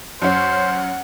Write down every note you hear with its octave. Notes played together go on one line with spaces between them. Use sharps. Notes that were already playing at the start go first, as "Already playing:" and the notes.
F#2 C#4 C5 F#5